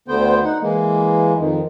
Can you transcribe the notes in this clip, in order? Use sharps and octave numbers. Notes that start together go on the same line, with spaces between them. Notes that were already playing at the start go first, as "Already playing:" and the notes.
D2 D3 B3 C5 G5
D#4 F#5
E3 G#3 A#3
F2 D#3